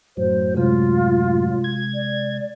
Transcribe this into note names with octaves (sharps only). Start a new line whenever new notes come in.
F#2 A2 F#3 C5
C3 G#3 F4
G#6
D5